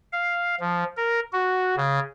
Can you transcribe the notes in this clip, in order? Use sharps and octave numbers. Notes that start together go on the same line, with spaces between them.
F5
F3
A#4
F#4
C#3